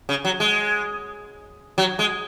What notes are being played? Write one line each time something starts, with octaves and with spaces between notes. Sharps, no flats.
C#3
F#3
G#3
F#3
G#3